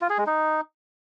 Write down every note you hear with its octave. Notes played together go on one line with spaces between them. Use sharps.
F4
G#4
G#3
D#4